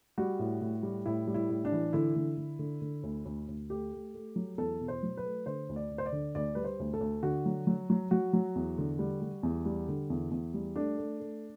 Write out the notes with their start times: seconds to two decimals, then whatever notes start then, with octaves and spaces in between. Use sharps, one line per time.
0.18 G3 F#4
0.39 A2
0.61 A2
0.83 G3
1.06 A2 E4
1.27 G3
1.34 E4
1.50 A2
1.65 D4
1.72 E3
1.93 D3 E4
2.16 D3
2.37 D3
2.59 D3
2.82 D3
3.03 D2
3.25 D2
3.48 D2
3.70 A3 G4
3.93 A3
4.14 A3
4.36 F#3
4.58 E2 A4
4.80 B2
4.88 C5
5.03 F#3
5.17 B4
5.25 A3
5.46 D3 C5
5.69 D2
5.76 D5
5.91 D2
5.98 C5
6.06 D5
6.12 D3
6.35 D2 D5
6.55 G3 B4
6.64 C5
6.79 D2
6.93 A4
7.00 D2
7.23 D3 F#4
7.46 F#3
7.67 F#3
7.90 F#3
8.11 F#3 F#4
8.33 F#3
8.55 E2
8.78 D3
8.99 G3
9.22 G3
9.43 E2
9.65 G3
9.88 D3
10.10 E2
10.31 E2
10.54 G3
10.76 A3 D4
10.98 A3
11.20 A3